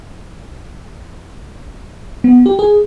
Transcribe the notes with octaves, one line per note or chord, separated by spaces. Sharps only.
B3
G4
G#4